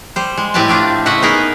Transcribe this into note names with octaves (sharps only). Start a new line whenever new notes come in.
G3 C5
G#3
A2 C4 G4 B4 G#5 A5
A3 C4 D4 F4
C#3 C#4 D#5 E5 F#5
B3 D#4 G#4 A#4 B4